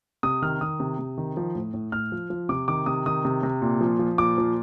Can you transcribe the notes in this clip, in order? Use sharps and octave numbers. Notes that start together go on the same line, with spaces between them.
C3 D#6
D#3 F6
D#3 D#6
C3
C3
D#3
F3
A2
A2
A2 F6
F3
F3
C3 D6
D#3 D6
C3 D#6
D#3 D#6
C3
C3
A#2
F3
F3
A#2 D6
F3